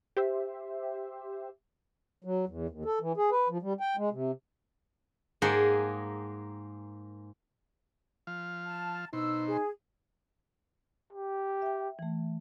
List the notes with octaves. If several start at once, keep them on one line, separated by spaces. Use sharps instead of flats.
G4 C5 E5
F#3
E2
D#2
A4
E3
G#4
B4
F3
G3
G5
G#3
C3
G#2 A#3 G#4 F#5 G5 A5
F3 F5
A5
B2 D#4 C5 E6
G#4
G4
E5 G5
E3 A3